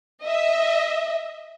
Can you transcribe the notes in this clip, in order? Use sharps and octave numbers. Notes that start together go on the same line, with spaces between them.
D#5 E5